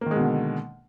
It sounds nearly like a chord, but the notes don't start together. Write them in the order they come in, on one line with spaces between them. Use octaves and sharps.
A#3 D#3 G#3 B2 D3